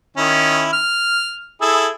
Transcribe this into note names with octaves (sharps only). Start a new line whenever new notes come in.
D#3 C#4 E4
F6
E4 G#4 A4